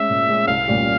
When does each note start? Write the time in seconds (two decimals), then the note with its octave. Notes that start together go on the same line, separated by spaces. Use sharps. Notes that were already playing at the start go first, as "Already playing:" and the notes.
Already playing: G#3 C#4 E5
0.10 A#2
0.29 G#3 C#4
0.48 C2 F5
0.67 A#2 G3 C#4 G4